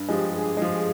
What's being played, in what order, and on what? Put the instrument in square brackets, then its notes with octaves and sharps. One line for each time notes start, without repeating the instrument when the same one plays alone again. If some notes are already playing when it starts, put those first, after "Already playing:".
Already playing: [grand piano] G2
[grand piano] F3 G#3 [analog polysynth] G4
[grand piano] G2 [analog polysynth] G#4
[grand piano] F3 G#3